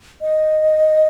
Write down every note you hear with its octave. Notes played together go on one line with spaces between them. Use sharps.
D#5